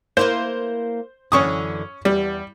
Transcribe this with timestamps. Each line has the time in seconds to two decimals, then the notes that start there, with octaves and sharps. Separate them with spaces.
0.17 A#3 E4 B4 C5
1.32 F#2 D3 E3 C#4 C#6 D#6
2.05 E2 G3